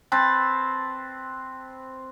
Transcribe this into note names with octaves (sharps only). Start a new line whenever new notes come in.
C4 B4 A5